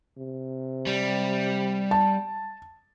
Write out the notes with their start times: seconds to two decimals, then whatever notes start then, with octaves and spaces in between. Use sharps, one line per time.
0.18 C3
0.87 G3
1.91 A5